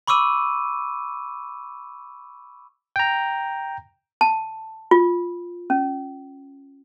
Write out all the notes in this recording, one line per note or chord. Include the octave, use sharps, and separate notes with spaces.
B5 C#6 D6 E6 D#7
G5 A#5
A5
F4
C#4